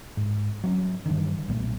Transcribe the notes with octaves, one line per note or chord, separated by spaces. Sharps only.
G#2
F#3 C4 C#4
G2 D3 D#3
B1 A#2 A3